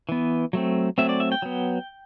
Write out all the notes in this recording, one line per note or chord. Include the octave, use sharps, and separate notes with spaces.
E3 B3
F#3 A3 C4
F#3 A3 C4 E5
D5
E5
G5
F#3 B3